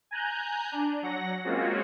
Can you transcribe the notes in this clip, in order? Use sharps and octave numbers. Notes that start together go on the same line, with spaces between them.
G#5 A#5 F#6 G6
D4
F#3 F#5 A#6
G#3 A#3 C4 C#4 F4 F#4